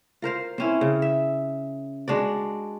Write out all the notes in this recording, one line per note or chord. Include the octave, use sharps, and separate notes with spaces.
F4 A#4 C5 F5
C4 C#4 E4
C#3
E5
G#3 D4 F#4 D5